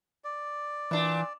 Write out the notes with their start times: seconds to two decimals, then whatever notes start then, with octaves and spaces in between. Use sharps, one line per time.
0.24 D5
0.91 A#2 E3 D4